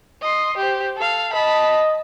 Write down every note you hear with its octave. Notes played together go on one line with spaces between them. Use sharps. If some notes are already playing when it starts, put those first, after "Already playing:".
D#5 C6
G4 C5
A4 F5
D#5 A5 B5